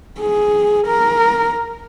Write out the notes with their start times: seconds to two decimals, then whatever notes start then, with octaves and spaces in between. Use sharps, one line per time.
0.19 G#4
0.87 A#4